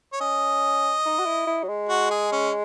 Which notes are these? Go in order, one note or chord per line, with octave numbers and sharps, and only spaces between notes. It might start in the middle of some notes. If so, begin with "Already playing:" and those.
C#5
C#4 D#5
D#4
F#4
E4
E4
F#3
G#3
F#4
G#4
C#4